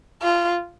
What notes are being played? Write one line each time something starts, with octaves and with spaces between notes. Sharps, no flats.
F4